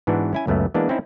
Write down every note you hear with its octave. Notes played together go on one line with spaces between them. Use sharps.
G#2 E3 B3 D4 F#4
C#4 E4 G#5
C#2 F#2 A3 B3
E3 G#3 A#3 B3 D4
C4 C#4 D#4 E4